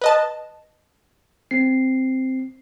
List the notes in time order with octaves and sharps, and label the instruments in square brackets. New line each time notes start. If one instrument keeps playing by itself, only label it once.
[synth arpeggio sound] B4 D#5 A5
[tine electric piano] C4 C7